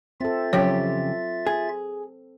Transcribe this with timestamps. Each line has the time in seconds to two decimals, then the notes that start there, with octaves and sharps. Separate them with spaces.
0.21 C4 F4 A4 E5 A6
0.53 F2 C#3 F#3 G4 C#5
1.47 G#4